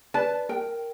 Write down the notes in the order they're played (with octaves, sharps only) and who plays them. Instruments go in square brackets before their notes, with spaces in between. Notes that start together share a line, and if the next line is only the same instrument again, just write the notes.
[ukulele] B4 D5 [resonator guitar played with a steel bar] A5
[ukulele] A#4 G5